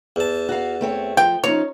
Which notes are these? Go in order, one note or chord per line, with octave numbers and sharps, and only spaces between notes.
E2 A5
F#4 F5
A3 C4 C#5
F3 G5
F3 C#4 D#4 C#5